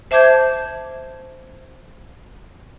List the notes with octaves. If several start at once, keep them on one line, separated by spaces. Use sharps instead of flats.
C5 E5 A5 D6 G6 G#6